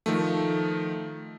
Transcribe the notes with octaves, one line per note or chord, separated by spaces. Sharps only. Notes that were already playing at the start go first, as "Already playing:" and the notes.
D#3 F3 A3